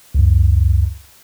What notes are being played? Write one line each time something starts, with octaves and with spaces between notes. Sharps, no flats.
C#2 F#2